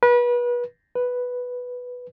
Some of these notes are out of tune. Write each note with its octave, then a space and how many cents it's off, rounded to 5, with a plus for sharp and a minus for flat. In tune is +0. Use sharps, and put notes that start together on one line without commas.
B4 -30
B4 +0